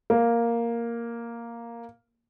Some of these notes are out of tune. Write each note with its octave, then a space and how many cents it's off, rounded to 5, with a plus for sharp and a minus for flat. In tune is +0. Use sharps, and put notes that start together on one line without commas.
A#3 +0